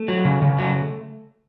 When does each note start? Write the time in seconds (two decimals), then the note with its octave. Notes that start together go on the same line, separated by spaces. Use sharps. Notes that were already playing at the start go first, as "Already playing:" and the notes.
Already playing: A3
0.08 F#3
0.25 C#3
0.42 C#3
0.59 F#3